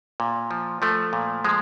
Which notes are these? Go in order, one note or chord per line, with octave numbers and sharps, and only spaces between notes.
A#2
F3
F3 A3
A#2
F3 G#3